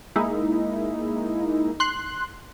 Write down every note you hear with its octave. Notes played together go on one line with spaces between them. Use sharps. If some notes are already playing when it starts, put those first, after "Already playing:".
G#3 A#3 D#4 E4
C6 F#6